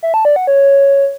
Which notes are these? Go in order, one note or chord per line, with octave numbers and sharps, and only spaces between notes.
E5
A5
D5
F#5
C#5